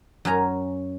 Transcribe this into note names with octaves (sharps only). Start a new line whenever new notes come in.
F#2 C#4 G#5 A#5